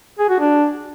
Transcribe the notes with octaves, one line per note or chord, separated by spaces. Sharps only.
G#4
F#4
D4